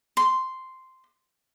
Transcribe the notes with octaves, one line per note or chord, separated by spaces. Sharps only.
C6